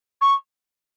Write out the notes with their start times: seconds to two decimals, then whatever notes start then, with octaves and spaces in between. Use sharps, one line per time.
0.21 C#6